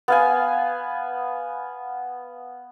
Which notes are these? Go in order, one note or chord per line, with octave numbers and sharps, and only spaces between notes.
B3 F5 G#5